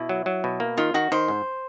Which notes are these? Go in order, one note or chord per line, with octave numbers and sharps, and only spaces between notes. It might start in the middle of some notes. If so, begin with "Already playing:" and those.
Already playing: B2 E4
F#3
F#3
B2
A#3
D#3 F4
D#3 F#4
D#3 C5
G#2